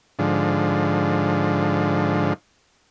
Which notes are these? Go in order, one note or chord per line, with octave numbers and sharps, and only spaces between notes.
G#2 D3 F3